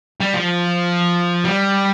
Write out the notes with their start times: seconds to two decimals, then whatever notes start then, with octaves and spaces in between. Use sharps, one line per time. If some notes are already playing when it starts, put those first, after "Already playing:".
0.21 G3
0.34 F3
1.45 G3